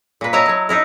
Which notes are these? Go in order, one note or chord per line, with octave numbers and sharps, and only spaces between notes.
A#2 B4
E4 C#5 D#5 E5 A5 A#5
F#3 C#5
D#4 E4 A#4